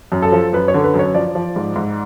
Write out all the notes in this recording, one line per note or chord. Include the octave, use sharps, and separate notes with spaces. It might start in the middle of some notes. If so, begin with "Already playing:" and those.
F#2
A4
F3
F#2 B4
C#5
D3
B4
F#2
C#5
F3 D5
F3
G#2
G#2